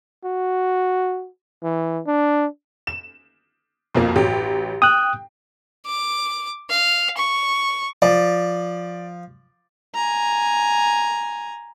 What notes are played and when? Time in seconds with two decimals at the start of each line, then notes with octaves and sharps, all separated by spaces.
0.24 F#4
1.63 E3
2.07 D4
2.87 E7
3.95 B1 F2 A#3
4.16 A1 F#3 G4
4.82 G5 D#6 F#6
5.86 D6
6.70 F5
7.18 C#6
8.02 F3 D5
9.95 G#5 A#5